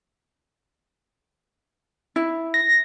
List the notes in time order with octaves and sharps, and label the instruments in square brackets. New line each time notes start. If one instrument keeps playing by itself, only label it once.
[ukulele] E4
[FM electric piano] A#6